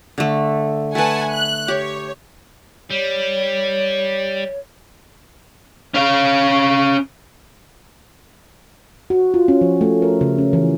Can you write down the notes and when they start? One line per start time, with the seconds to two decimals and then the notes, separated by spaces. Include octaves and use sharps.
0.18 D3 A3
0.95 A3 B4 F#5 G#5 A5
1.31 F#6
1.68 G4 C#5
2.90 G3 C#5
5.94 C#4 F5
9.10 F#4
9.34 F4
9.48 C#4
9.61 F3
9.81 A3
10.02 A#4
10.21 C#3
10.38 C#4
10.53 E3